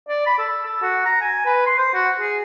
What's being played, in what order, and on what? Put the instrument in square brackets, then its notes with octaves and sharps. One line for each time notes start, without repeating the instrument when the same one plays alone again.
[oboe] D5
B5
A4
A4
F#4
A#5
G#5
B4
C6
C5
F#4
G#4